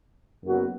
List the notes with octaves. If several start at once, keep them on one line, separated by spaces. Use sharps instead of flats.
F#1 F#2 F#3 B3 F#4